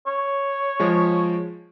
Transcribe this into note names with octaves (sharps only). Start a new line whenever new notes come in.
C#5
F3 G#3